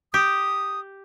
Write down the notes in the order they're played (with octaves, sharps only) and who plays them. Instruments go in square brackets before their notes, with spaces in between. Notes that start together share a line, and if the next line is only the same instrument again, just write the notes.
[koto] G4 [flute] D#6